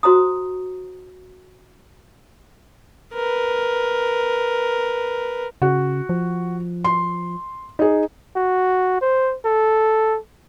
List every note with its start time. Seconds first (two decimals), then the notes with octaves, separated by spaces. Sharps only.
0.03 F#4 C5 A#5 D#6
3.14 A#4 B4
5.62 C#3 F#4
6.09 F3
6.84 C6
7.79 D#4 G#4
8.36 F#4
9.01 C5
9.45 A4